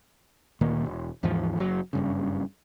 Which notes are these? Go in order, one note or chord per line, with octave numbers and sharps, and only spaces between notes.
D2 A#2 D#3 A#3
E1
D#2 G#2 E3 F3
F#1 F#3
F#1 G2 C#3